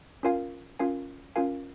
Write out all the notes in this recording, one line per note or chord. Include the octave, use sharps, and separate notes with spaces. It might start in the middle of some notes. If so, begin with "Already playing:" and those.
C#4 F4 A#4 F5 G#5
C#4 F4 A#4 F5 G#5
C#4 F4 A#4 F5 G#5